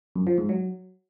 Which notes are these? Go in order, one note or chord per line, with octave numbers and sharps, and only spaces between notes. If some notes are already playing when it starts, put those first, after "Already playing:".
F#2
F3
G#2
F#3